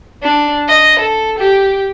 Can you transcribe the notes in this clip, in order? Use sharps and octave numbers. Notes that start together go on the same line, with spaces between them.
D4
D#5
A4
G4